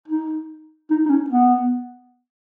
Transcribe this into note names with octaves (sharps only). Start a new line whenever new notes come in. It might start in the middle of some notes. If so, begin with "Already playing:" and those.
D#4
D#4
D#4
C#4
B3